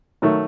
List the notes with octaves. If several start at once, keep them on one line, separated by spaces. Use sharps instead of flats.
D#3 F#3 A3